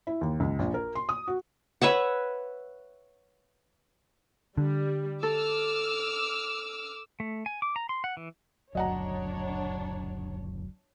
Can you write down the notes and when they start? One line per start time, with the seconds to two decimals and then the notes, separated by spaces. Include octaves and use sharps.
0.07 E4
0.21 D#2
0.40 C#2
0.59 A#1
0.74 A#4
0.95 C6
1.09 D#6
1.27 F#4
1.82 B4 C#5 E5 F#5
4.57 D3 G3
5.23 A4 D6 E6 F6
7.20 A3
7.46 G#5
7.62 D6
7.76 A#5
7.89 C6
8.04 F#5
8.17 E3
8.75 F#1 D2 F#3 D4 C#5 D#5 F#5 A#5